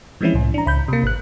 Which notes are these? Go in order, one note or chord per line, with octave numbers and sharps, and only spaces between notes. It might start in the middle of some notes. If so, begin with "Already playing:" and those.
E3 F3 G#3 C4 C#4 E4
C2 A2
D4 A#5
C#2 B5 G6
C3 A#3
G#1 F#6